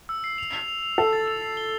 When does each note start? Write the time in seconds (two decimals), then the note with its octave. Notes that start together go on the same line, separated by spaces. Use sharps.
0.09 E6
0.24 C7
0.38 F7
0.54 F7
0.68 F7
0.83 F7
0.98 A4 C7
1.13 A6
1.28 F7
1.42 C7
1.57 G7